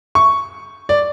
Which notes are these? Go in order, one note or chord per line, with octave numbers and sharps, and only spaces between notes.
C#6
D5